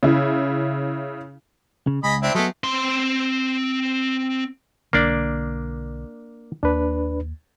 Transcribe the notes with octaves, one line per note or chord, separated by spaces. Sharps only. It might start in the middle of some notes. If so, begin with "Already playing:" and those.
C#3 E4
C#3
C#2 G#4 D#5 B5
C4 D4 E4
F#3 G#3 A3 B3
C4 C6
B1 D3 A#3 D4 D5
D#2 A#3 D4 B4